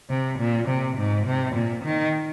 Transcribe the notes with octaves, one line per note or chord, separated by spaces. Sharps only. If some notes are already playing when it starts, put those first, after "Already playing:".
C3
A#2
C3
G#2
C3
A#2
D#3